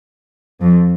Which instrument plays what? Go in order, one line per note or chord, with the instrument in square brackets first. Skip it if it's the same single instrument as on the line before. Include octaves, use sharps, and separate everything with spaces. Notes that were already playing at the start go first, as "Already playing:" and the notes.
[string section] F2